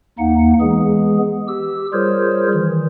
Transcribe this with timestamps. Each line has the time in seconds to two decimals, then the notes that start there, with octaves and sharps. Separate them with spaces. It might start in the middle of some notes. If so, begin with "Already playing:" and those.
0.19 D#2 A#3 D#4 F#5
0.60 E3 G#3 B3 G#4
1.48 G4 E6
1.93 G3 F4 G#4 A#4 C5 C#5
2.53 D#3 E3